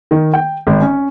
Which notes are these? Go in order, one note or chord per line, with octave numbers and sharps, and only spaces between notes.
D#3
G5
G#1
C#4